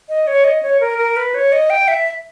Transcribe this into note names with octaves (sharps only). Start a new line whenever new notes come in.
D#5
C#5
D#5
C#5
A#4
A#4
B4
C#5
D#5
G5
E5